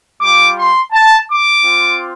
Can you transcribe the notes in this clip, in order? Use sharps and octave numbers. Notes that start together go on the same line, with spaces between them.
G3 F4 D6
C6
A5
D6
C4 F4